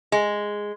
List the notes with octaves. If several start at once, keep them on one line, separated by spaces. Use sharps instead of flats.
G#3